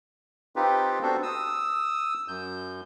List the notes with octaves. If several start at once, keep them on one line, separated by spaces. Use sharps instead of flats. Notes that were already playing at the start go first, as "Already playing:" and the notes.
C4 D#4 F4 G4 B4
B3 D4 F#4 A4 C5
D#6 E6
F#2 G6